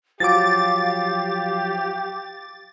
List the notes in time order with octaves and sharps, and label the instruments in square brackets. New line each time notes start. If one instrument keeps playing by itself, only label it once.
[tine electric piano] F3 F#3 [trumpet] G4 [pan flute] F5 [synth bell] D6 A6